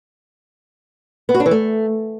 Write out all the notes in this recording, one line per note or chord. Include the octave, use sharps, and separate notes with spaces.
B3
F#4
D4
E3
A3